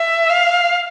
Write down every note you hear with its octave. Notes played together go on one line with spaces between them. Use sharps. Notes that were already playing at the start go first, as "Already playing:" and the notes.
Already playing: E5
F5